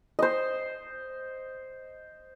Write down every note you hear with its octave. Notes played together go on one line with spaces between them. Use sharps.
C5 D#5